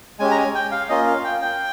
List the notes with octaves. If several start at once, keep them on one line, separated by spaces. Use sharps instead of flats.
G#3 C#4 G4 G#5
A#5
G#5
G5
F5
A#3 C#4 F4 D#5
F5
G5
G5